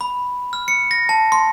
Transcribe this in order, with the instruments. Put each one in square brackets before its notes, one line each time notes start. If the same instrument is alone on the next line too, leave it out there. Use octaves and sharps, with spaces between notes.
[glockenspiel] B5
F6
C#7
A#6
A5
C6